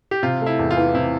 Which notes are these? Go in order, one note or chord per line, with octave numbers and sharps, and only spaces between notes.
G4
C3 F4
A3
E4
E2
F4
E3
C3 E4